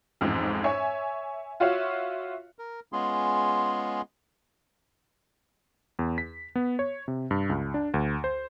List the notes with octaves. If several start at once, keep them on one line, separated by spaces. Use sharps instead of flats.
A1 F2 G#2
C#5 E5 G#5 C#6
F4 F#4 C#5 E5 F5
A#4
G#3 B3 C#4 F4 G#4 C6
E2
B6
B3
C#5
C3
G2
C#2
D4
D2
C5